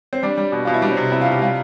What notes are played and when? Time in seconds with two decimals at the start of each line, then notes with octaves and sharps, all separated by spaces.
0.13 C4
0.23 G3 D4
0.37 G3
0.52 B2
0.65 B2 F4
0.74 E4
0.82 G3 D4
0.92 C4
0.97 C3
1.12 C3 E4
1.21 F4
1.26 C3
1.31 G4
1.41 G3 F4